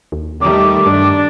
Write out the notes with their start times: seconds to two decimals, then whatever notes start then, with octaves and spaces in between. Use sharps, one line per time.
0.12 D#2
0.41 D#3 G3 A3 D6
0.86 G2 D4